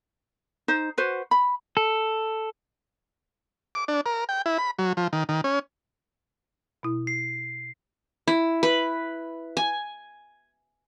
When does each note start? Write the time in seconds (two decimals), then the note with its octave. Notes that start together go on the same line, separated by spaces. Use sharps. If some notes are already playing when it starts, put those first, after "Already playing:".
0.68 D#4 C5
0.98 F#4 B4 C5
1.31 B5
1.77 A4
3.75 D6
3.88 D4
4.06 A#4
4.29 G5
4.46 E4
4.58 B5
4.79 F#3
4.97 F3
5.13 D#3
5.29 D#3
5.44 C#4
6.83 B2 E4
7.07 C7
8.27 E4
8.63 B4
9.57 G#5